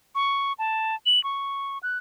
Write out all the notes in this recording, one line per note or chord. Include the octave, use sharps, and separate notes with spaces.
C#6
A5
F#7
C#6
F#6